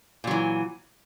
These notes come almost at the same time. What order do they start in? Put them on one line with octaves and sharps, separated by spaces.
A#2 F#3 E3